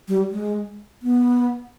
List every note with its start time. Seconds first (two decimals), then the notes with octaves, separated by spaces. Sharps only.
0.08 G3
0.31 G#3
1.03 B3